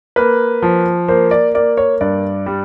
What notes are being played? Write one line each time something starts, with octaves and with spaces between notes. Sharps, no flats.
A#3 B4
F3
A#3 C5
D5
A#3 D5
C#5
G2 D5
G3